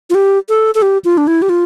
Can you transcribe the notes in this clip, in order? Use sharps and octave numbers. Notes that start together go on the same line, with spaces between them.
F4
G4
A4
A4
G4
F4
D4
E4
G4
F4